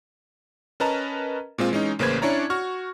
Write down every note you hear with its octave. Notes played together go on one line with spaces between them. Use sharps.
C#4 A#4 B4 D#5 A5 A#5
A#2 G#3 C4 F4
E3 G#3 C#4 D#4
A1 C#3 A#3 B4 C5 G#6
C#4 D4 E4 C#5 D5 A#5
F#4 C#6 F6